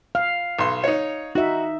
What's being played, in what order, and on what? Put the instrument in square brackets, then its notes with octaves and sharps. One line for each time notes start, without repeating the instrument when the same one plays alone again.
[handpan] F5 [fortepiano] F6
[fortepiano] B1 C6
D#4 C#5
[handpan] D#4 E5 [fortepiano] F#4